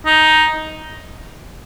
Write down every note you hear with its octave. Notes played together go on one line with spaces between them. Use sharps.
D#4